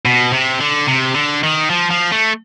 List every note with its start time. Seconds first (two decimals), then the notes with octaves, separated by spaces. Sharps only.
0.05 B2
0.33 C3
0.61 D3
0.87 C3
1.15 D3
1.43 D#3
1.70 F3
1.91 F3
2.12 A3